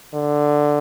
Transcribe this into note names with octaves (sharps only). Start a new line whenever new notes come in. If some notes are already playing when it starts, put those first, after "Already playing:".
D3